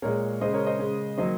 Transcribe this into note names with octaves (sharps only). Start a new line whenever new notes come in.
A#2 G#3 A#4 C#5
C#3 G#3 C5 D#5
A#4 C#5
C5 D#5
C#3 G#3
D#3 F#3 A#3 C5 D#5